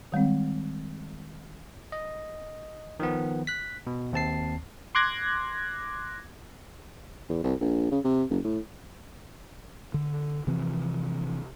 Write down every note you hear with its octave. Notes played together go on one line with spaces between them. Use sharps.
D#3 G3 G#3 C4
D#5
D#3 F3 B3
F#6 B6
B2
D#2 C4 A5 C7
C6 D6 F#6 G#6 A#6
E2
C2
A#1
C#3
C3
F#1
A2
D3
C3 E3 F3 C4